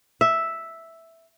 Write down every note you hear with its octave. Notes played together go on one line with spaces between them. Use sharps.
E5